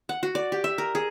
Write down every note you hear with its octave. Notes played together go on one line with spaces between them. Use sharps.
F#5
F#4
D5
G4
E5
A#4
G#4